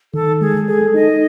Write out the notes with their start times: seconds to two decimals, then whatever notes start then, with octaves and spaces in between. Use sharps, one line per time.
0.14 D#3 A4
0.41 G#3 G#4
0.68 G#4 A4
0.94 D#4 D#5